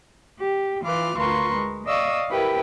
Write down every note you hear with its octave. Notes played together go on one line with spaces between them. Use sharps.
G4
E3 F4 B4 D6 F6
D2 F4 A#4 B4 C6 C#6
G#3
D5 D#5 F5 C#6 D#6 E6
E4 G4 A#4 B4 G5